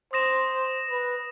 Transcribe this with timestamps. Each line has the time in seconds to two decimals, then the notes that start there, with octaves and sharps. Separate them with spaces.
0.13 C5 D#6 A#6 E7
0.89 B4